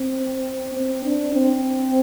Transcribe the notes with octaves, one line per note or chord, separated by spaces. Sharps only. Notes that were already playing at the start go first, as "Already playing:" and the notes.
Already playing: C4
C4
D4
C4